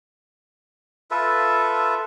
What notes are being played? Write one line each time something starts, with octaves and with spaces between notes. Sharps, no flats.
F4 A4 B4 E5